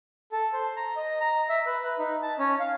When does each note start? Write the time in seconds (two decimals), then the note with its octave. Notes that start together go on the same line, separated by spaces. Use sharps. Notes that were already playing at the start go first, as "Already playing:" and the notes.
0.32 A4
0.53 C5
0.77 A#5
0.96 D#5
1.21 A#5
1.49 E5
1.66 B4
1.83 B4
1.99 D#4
2.22 A5
2.39 C#4
2.60 F5